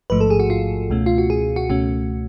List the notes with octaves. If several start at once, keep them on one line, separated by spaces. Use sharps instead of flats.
A1 G#2 F3 A3 B4
A4
G#4
F#4
F4
C#2 B2 A3 C#4
F4
F#4
G#4
F#4
C#2 B2 A3 C#4 F#4